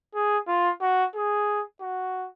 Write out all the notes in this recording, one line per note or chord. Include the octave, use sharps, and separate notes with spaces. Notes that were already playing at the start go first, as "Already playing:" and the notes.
G#4
F4
F#4
G#4
F#4